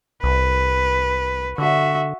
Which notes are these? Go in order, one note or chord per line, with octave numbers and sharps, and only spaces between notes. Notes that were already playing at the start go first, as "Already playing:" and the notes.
C2 B4
D3 F#4 E5